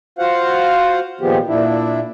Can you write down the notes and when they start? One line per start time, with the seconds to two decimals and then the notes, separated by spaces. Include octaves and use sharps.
0.19 F4 F#4 C5 F5 F#5
1.21 A#2 D#3 F3 G#3 B3 G4
1.47 A#2 D4 E4